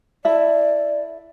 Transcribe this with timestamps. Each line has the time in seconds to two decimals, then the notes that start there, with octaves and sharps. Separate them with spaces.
0.25 E4 A4 D5 E5